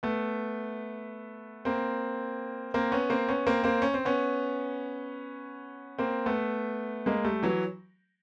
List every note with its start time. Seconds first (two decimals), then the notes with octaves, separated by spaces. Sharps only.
0.03 A3 B3
1.65 A#3 C4
2.74 A#3 C4
2.92 B3 C#4
3.10 A#3 C4
3.28 B3 C#4
3.47 A#3 C4
3.64 A#3 C4
3.82 C#4
3.94 C4
4.05 B3 C#4
5.98 A#3 C4
6.26 A3 B3
7.06 G#3 A#3
7.24 G3 A3
7.43 E3 F#3